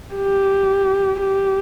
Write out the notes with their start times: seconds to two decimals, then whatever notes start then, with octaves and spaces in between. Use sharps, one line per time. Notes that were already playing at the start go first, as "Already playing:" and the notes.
0.14 G4
1.20 G4